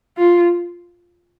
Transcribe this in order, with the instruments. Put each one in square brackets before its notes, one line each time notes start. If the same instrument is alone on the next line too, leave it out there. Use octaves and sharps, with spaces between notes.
[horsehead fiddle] F4